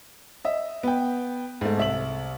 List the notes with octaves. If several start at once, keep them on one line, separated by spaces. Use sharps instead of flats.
D#5 E5
B3 G5
G#2 A3
C2 E5 F#7